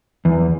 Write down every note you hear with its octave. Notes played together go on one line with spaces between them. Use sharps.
E2